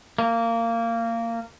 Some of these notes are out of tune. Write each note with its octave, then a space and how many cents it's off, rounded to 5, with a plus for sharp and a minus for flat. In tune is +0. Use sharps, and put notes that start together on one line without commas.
A#3 -20